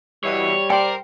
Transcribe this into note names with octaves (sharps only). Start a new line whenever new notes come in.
B2 E3 G3 C#5
A#4 C5 D5 G5